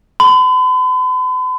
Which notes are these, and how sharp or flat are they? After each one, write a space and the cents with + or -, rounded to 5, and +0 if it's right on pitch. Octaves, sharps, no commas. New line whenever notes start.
B5 +45